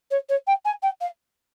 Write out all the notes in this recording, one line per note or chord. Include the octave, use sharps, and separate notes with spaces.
C#5
C#5
G5
G#5
G5
F5